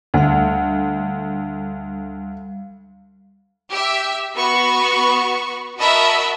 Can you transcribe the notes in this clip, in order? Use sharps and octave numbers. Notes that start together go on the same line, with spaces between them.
D2 G3 F5
G4 E5
B3 F#4 B5 C#6
F#4 A#4 D#5 E5 A5 B5